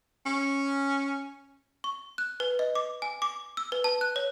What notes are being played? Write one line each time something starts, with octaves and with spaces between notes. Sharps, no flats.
C#4
C#6
F#6
B4
D#5
D6
G#5
D6
E6
B4
A5
F#6
C#5